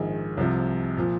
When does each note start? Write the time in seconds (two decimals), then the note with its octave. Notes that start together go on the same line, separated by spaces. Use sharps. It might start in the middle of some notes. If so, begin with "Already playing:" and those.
Already playing: A#1 G#2 D#3 G#4
0.37 C2 C3 F3
0.97 A#2 F3